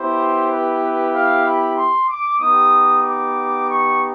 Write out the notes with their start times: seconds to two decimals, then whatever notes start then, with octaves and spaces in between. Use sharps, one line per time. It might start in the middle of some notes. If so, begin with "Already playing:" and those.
Already playing: B3 E4 G4 C5
0.49 B4
1.13 F5
1.45 B5
1.76 C6
2.08 D6
2.39 B3 D#4 G4 D#6
3.03 D6
3.67 C#6